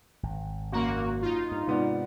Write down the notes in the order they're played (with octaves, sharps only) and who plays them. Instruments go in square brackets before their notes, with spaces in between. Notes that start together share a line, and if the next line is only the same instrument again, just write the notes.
[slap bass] G#1
[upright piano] F#1 A#5 [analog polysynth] A#3 F#4
[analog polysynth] D#4 F4
[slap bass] G2
[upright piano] G#2 B3 D5 [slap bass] C3